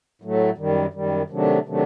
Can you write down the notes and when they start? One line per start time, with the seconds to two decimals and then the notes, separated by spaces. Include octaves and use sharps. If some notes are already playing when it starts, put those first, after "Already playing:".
0.22 A2 F#3 A3
0.58 F#2 D#3 G3
0.93 F#2 D#3 G3
1.30 C3 D#3 F#3 A3 D4
1.65 C3 D#3 F#3 A3 D4